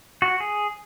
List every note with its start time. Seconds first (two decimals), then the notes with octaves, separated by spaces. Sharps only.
0.22 F#4
0.40 G#4